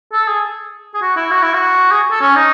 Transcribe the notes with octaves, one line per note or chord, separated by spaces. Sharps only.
A4
G#4
G#4
F#4
E4
F#4
E4
F#4
G#4
A4
C#4
D#4